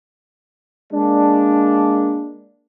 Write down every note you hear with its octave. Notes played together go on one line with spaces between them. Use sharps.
G#3 A#3 D4